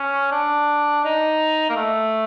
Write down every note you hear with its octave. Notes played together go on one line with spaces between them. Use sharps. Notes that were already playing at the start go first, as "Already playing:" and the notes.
Already playing: C#4
D4
D#4
A#3
A3